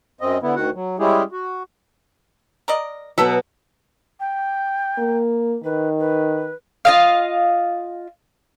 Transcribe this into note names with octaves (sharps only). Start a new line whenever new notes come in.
F#2 C4 D#5
D3 B3 E4
D2 D#3 F#4 F#5
F#3
G3 G#3 C#4 E4 G4 G#4
F#4
A#4 D5 D#5
B2 F#3 A4 E5
G5
A#3
D#3 B4
B4
F4 D#5 F5